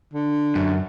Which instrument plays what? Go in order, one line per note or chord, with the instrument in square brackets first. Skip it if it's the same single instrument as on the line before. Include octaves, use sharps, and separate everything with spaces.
[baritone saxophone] D3
[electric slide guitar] F#2